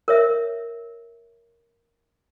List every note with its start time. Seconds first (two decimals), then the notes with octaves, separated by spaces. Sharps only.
0.08 A#4 C#5 E5